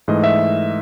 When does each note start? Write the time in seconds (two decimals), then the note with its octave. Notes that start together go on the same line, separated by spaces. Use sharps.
0.08 G#2 E3 A3 D#5
0.24 E5